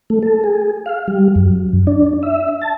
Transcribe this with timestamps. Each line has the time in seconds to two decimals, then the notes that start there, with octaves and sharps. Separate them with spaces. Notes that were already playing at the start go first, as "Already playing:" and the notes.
0.10 A3
0.23 A4
0.44 G#4
0.86 F5
1.08 G3
1.36 F#2
1.87 D4
2.23 E5
2.62 A5